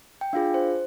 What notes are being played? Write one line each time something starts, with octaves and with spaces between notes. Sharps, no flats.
G5
D4 F4 G#4 F5
C5